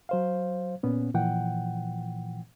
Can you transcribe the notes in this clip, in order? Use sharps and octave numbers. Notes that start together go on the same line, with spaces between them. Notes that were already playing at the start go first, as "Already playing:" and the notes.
F#3 C5 F5
A#2 B3 C#4
A#2 E3 F3 F#5 G5